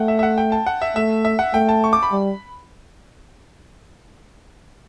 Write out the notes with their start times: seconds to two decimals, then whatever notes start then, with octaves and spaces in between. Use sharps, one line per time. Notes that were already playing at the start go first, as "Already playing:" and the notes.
Already playing: A3 F#5 G5
0.08 E5
0.19 E5
0.23 F#5
0.38 G5
0.52 A5
0.66 F#5
0.82 E5
0.96 A3 E5
1.25 E5
1.39 F#5
1.54 A3 G5
1.69 A5
1.84 C#6
1.93 D6
2.03 B5
2.12 G3